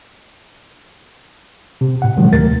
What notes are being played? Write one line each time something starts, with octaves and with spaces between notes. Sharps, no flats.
C3
A2 F#5
A2 C3 D#3 F3 F#3 G#3
D2 A3 A#4 A6